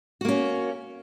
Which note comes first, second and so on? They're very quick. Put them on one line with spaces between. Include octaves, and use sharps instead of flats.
F#4 A#3 C#4